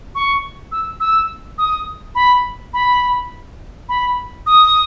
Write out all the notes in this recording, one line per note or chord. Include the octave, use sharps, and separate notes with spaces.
C#6
E6
E6
D#6
B5
B5
B5
D#6